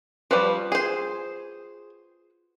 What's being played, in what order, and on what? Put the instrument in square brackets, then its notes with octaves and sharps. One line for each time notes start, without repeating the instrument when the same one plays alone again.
[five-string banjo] F3 G3 [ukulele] F4 F#4 B4
[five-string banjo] G#4 C5